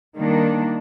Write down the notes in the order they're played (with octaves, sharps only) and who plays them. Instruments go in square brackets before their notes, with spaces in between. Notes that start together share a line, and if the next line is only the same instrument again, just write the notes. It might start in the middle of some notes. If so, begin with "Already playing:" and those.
[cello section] D#3 G3 A#3 D4